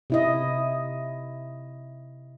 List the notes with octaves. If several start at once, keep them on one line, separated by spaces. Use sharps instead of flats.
C3 E4 D#5